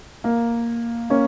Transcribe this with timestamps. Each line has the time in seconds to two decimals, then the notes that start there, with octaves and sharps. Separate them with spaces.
0.24 A#3
1.10 A#3 C#4